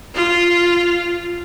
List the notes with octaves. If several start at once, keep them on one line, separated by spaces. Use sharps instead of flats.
F4